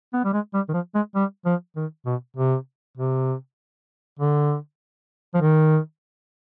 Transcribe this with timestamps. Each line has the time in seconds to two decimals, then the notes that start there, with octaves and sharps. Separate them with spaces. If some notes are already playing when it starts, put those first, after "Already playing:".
0.13 B3
0.25 G3
0.33 G#3
0.54 G3
0.69 D#3
0.74 F3
0.95 G#3
1.15 G3
1.45 F3
1.76 D#3
2.06 B2
2.37 C3
2.97 C3
4.19 D3
5.35 F3
5.41 D#3